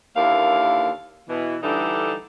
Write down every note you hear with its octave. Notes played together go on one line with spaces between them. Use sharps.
D#2 D3 A#3 E4 F5
B2 E3
D3 E3 G3 A3 D4 D#4